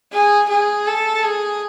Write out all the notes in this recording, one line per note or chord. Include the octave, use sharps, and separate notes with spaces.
G#4
G#4
A4
G#4